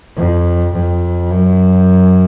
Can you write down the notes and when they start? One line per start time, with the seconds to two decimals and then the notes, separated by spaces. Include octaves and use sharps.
0.17 F2
0.74 F2
1.31 F#2